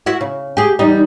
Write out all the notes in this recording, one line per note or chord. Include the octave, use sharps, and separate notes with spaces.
E4 F#4 E5
C#3
G4 G#4
E2 G3 D#4